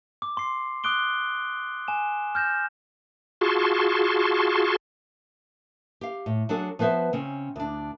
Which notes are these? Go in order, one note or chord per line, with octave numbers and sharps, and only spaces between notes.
D6
C6 C7
C6 D6 D#6 F#6 D7 G7
G#5 E7
F6 G6 A#6 E7
F4 F#4 G#4 A5 C6 C#6
G4 F5
A2
F#3 D4 F#4 G#4 A4
F3 B3 B4 C5 E5
C#3 C4 C#4
D2 D4